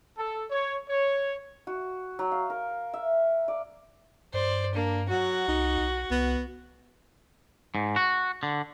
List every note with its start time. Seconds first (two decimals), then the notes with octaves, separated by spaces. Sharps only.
0.18 A4
0.50 C#5
0.89 C#5
1.67 F#4
2.19 F#3
2.32 F5
2.50 A#4
2.94 E5
3.48 D5
4.34 G2 C5 D5
4.75 A#3 D4
5.10 F#3 F#4
5.48 C2 D#4
5.78 B1
6.11 C2 B3
7.75 G#2
7.96 F#4
8.43 D3